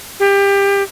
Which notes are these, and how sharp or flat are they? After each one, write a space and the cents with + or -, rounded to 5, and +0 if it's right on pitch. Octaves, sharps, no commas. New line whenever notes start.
G4 +25